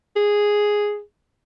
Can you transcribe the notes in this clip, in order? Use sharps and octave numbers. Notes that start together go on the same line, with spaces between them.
G#4